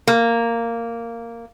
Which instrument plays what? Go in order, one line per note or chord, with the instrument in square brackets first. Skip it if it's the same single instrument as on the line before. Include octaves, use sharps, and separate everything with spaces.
[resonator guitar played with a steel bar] A#3